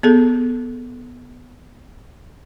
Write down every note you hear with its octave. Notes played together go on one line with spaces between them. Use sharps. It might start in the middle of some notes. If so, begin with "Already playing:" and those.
B3 G#4 A4